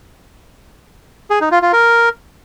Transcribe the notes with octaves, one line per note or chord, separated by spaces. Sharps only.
G#4
D#4
F4
F4
A#4